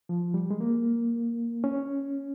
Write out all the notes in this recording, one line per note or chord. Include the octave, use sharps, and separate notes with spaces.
F3
G3
G#3
A#3
C#4